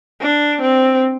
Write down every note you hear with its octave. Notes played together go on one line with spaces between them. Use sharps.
D4
C4